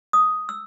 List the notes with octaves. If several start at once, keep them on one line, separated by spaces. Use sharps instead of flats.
D#6
E6